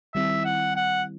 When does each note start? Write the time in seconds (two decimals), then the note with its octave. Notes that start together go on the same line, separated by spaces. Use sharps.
0.14 D#3 G3 C4 E4 E5
0.45 F#5
0.76 F#5